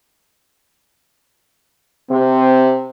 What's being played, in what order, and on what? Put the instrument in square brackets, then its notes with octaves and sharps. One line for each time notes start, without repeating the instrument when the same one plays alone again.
[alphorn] C3 [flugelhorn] C4